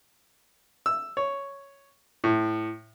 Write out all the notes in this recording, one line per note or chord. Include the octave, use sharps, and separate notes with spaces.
E6
C#5
A2